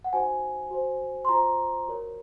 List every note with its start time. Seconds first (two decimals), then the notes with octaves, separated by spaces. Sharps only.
0.04 F#5
0.13 D#4 F#4 C5 G#5
0.71 F#4 C5
1.25 C6
1.29 F4 C5 A#5
1.87 F#4 A#4 C#5